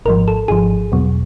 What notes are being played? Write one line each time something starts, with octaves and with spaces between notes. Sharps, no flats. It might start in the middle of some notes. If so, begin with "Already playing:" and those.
G#1 G#2 F3 A#4
A4
G#1 G#2 F3 G#4
E2 B2 F#3